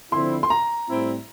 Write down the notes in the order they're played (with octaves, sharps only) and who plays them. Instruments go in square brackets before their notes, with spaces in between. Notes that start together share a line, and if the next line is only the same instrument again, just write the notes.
[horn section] D3 F3 C4 E4 [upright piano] C6
[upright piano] C6
A#5
[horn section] A2 G3 C4 E4